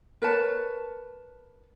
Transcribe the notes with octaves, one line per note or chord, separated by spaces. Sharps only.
A#4 B4 C#5 A5